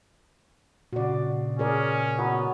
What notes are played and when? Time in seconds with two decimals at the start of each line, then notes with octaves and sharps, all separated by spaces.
0.93 A#2 C#3 F#4 D5
1.59 C#4 G#4 A#4 D5
2.18 F#3 B3 B5